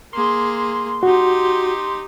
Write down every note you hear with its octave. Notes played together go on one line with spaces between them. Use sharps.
A#3 G#4 C6
D#4 F#4 G4